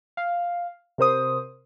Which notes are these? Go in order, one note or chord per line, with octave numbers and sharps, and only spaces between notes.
F5
C3 A#4 C5 D#6